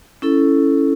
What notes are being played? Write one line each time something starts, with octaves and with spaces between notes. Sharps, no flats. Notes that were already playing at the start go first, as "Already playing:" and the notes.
C#4 E4 A4